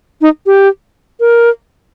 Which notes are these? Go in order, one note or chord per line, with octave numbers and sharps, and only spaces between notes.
D#4
G4
A#4